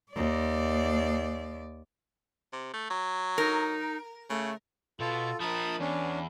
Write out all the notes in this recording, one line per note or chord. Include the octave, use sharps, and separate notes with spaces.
D#2 D5
C3
A3
F#3
D#4 A#4
C#3 A3
B2 F4 A4
F3 A#4 A5 B5 D#6
E2 C#4 D4